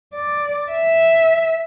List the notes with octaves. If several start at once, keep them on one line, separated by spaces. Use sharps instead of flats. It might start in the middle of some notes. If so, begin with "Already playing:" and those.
D5
E5